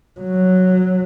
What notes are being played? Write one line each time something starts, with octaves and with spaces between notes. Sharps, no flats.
F#3